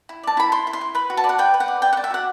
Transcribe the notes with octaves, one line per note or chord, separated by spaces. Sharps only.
E4
D5 A5
E4 B5
E4 C6
E4
C6
E4
B4 B5
F#4
A5
D5
F#5
B4 G5
B4
F#5
D5
D5 G5
F#5
D5
E5
F#4 F#5